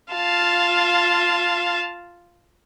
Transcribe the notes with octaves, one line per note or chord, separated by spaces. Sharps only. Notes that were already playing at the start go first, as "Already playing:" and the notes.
F4 F5 A5